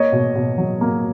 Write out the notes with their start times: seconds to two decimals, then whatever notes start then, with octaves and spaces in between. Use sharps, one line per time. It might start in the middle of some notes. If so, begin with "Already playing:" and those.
Already playing: A#3 C#5 D#5
0.12 B2
0.35 B2
0.58 F#3
0.81 A#3